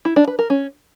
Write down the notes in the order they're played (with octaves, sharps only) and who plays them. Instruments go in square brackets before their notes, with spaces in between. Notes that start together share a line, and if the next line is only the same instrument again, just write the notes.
[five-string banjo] E4
D4
B4
A#4
C#4